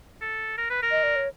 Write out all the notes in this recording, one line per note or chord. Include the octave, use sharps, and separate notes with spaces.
A4
A#4
B4
A#4
D#5
D5
C#5